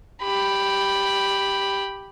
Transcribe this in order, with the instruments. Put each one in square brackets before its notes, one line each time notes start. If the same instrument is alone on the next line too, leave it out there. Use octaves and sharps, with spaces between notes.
[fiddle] G4 B5